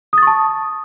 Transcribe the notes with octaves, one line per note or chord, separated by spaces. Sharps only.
A5 C#6 D#6 A6